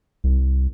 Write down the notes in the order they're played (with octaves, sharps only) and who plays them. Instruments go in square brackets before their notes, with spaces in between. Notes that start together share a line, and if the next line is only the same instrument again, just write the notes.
[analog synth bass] C2